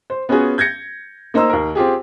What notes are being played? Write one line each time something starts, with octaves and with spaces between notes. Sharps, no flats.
C5
B3 C#4 F4 F#4 G#4
G6 G#6 A#6 C#7
A#3 D#4 C5 A#5 E6
D#2 A#4
C4 F4 G4 G#4